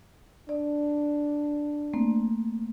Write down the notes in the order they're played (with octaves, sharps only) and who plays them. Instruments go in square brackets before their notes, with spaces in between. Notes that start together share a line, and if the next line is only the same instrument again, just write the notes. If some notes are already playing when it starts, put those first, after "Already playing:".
[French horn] D4 [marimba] D5
[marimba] A3 A#3 C4